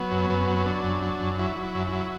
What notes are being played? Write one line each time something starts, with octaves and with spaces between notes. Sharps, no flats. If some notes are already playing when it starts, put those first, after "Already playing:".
Already playing: F#3 B3
F#2
F#2 B3
F#3
B3
F#3 D4
F#2
F#3
F#2
F#3 E4
F#3
E4
F#2
E4
F#3